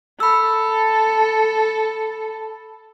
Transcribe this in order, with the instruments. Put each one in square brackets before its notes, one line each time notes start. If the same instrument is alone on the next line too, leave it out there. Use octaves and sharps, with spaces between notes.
[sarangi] A4 [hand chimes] B5 E6